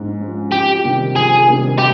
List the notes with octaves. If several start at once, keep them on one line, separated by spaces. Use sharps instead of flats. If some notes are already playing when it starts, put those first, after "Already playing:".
Already playing: G#2 F3 G#3 C#4
F3 G#3 C#4
F2 G4
C3 D#3 G3
F2 G#4
C3 D#3 G3
G4